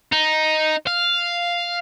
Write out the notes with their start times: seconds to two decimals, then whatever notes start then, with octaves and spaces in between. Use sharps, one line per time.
0.12 D#4
0.87 F5